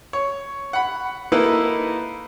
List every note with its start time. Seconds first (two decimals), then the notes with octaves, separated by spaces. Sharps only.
0.13 C#5
0.73 F#5 B5
1.32 A#3 D#4 E4 A4 B4